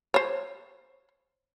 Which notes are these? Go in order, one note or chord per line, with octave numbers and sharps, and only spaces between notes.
C5 C#5